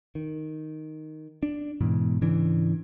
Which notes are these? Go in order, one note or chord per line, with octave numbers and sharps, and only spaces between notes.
D#3
D4
G#2 B2 E3
G#2 C#3 E3 D4